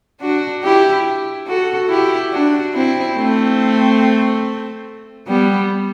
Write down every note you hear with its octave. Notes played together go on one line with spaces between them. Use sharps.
D4 F#4
E4 G4
F#4 A4
E4 G4
D4 F#4
C4 E4
A3 C4
G3 B3